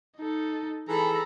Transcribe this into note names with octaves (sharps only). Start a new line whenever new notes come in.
D#4 A4
E3 G#4 A4 A#5 B5